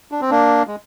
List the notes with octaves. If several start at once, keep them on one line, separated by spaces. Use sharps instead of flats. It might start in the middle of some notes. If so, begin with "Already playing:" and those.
D4
C4
A#3 D4
G#3